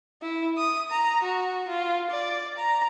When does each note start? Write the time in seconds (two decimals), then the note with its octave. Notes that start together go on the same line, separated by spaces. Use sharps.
0.22 E4
0.57 D#6
0.91 A#5
1.23 F#4
1.68 F4
2.10 D5
2.58 A#5